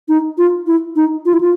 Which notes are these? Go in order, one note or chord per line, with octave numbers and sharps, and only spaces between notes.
D#4
F4
E4
D#4
F4
E4
F4